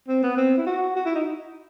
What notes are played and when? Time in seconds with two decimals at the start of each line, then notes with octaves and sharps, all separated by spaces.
0.08 C4
0.23 B3
0.37 C4
0.57 E4
0.66 F#4
0.96 F#4
1.06 E4
1.15 D#4